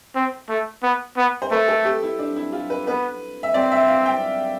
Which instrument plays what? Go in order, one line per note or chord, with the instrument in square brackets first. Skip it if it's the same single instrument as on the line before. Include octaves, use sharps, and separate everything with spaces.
[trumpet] C4
A3
B3
B3
[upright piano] C5
[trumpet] A3 [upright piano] B4
[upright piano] A4
G4
E4
D4
E4
F4
B4
[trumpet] B3 [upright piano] B4
[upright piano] E5
[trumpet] C4 [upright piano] D5
[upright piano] E5
F5
G5